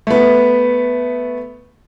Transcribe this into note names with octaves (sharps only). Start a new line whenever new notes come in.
A3 B3